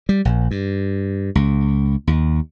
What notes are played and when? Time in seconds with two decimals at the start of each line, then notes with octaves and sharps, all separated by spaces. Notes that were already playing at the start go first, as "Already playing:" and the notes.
0.09 G3
0.25 A#1
0.51 G2
1.35 C#2
2.07 D#2